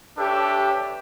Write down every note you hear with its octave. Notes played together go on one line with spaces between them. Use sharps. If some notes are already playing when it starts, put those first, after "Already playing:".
D4 G4 A4 B4 C#5 E5